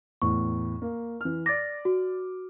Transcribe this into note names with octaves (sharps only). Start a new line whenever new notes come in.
E2 A2 C#6
A#3
E3 F6
D5 D6 A6 A#6
F#4